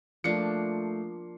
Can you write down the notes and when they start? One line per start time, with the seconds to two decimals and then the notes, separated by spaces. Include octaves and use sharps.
0.24 F3 A3 A#3 D4 C7 C#7